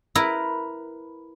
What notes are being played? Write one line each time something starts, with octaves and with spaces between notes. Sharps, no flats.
E4 A#4 B4